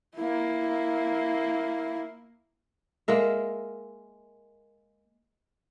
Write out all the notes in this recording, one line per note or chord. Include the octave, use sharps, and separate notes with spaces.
A#3 E4
G#3 A#3 A#4 E5